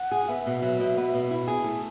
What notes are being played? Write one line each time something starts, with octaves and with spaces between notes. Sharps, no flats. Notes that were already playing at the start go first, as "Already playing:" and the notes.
Already playing: F#5
G#4
B3 E5
B2
F#3
B2
B3
B2
E4
G#4
A3